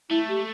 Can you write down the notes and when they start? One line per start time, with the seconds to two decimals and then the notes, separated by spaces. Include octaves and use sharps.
0.10 A3 E4
0.29 G4